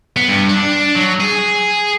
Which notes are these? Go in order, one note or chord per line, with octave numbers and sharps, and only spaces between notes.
B3
G2
D4
F#3
G#4